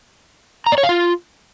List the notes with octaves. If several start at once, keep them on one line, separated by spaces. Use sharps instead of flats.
A#5
D5
C#5
F5
F4